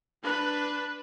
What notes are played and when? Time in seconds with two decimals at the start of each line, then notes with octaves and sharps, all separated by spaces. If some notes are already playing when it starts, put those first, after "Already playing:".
0.24 D4 B4